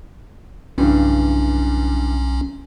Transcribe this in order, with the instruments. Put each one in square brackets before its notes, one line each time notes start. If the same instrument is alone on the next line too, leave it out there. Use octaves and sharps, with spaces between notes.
[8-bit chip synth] B1 C#4 [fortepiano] G2 C#3 E3